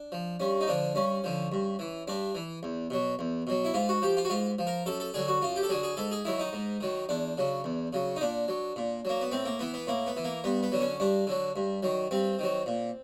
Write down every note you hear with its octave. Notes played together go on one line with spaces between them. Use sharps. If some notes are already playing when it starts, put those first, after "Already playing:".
Already playing: D4
F3
G2 C#4
D#4
D3 F3 D4
G2 C#4
D3 F3
G2
E3
G2 D4
E3
E2
B2 F#3
E2
B2 F#3
E4
G#2 F4
F#4
F3 G4
F4
F#4
G#2 F4
F3
A#4
F#2 A4
A4
D3 F#3 G#4
F#4
F#2 F4
G4
A4
D3 F#3 G#4
G#4
G#2 A4
G#4
D#3 F#3 E4
D#4
G#2
D#3 F#3
E2 D4
C#3 F#3
E2
C#3 F#3
D#4
A#2 D4
F#3
A#2
F#3 A#3
B3
A2 C4
A#3
E3 B3
B3
A2 A#3
B3
E3
A#3
G2 B3
B3
D3 F#3
C#4
G2 D4
D3 F#3
G2
D#3 F#3
G2 C4
D#3 F#3
A#2